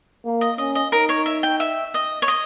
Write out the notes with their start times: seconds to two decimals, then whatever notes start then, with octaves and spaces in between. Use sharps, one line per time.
0.25 A#3
0.41 D#5
0.58 C#4 D#5
0.75 D#5
0.92 D#4 A#4
1.09 C#5
1.26 E5
1.43 G5
1.60 E5
1.94 D#5
2.22 C#5
2.28 D#5